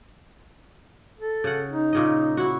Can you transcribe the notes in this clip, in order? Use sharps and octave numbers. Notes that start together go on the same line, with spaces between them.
A4
C#3 F#5
D#4
A#2 C#3 D#5
E4 F#4